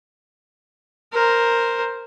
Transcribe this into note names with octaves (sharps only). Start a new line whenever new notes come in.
A#4 C5